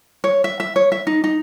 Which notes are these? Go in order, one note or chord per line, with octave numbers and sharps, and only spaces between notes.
C#5
E5
E5
C#5
E5
D#4
D#4